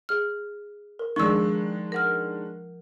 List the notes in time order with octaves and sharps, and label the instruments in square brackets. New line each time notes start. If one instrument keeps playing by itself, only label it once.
[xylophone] G#4 F6
A#4
[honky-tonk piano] D#3 G#3 D4 [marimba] F3 [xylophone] C#6 E6
[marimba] A#4 F#5 F6